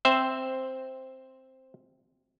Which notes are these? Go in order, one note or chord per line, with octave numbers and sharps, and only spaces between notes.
C4 C5 E5